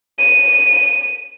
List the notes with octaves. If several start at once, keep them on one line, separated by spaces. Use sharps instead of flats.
D#7